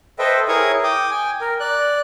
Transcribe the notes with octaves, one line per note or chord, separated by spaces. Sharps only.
A4 B4 C5 D#5 E5 G5
E4 G#4 A#4 C#5 C#6 D#6
G5 D6 D#6
G5 G#5
A#4
D5 F#6